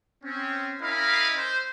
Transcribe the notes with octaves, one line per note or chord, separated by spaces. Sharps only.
C4 C#4
C#4 E4 A#4 D#5 F5 B5
C5